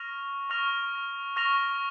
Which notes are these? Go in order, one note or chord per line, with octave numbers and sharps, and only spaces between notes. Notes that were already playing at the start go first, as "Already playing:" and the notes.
Already playing: C#6 F6 A#6 F7
C#6 F6 A#6 F7
C#6 F6 A#6 F7